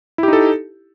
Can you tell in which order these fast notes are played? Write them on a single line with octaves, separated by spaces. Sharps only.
E4 G4 D#4 A4